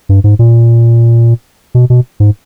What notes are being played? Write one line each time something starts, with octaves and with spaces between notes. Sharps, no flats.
G2
G#2
A#2
B2
B2
G#2